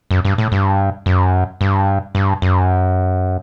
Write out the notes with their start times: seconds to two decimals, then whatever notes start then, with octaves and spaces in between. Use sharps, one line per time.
0.11 F#2
0.25 G2
0.38 A2
0.52 G2
1.06 F#2
1.61 G2
2.15 G2
2.42 F#2